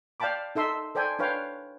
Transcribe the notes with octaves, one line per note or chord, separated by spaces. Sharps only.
D5 F5 G5 A5 B5 D6
D#4 A4 E5 C6 E6
A4 C5 D5 G5 G#5
D4 B4 C#5 F5 G5